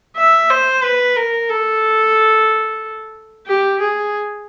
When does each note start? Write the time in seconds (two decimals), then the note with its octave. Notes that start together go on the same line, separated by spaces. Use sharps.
0.16 E5
0.50 C5
0.83 B4
1.16 A#4
1.49 A4
3.47 G4
3.81 G#4